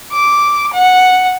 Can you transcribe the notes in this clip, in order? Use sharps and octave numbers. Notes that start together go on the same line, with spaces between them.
D6
F#5